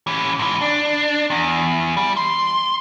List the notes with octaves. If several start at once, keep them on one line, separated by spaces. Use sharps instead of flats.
E3 C#4
G#2 E3
D4
E2
G3
C6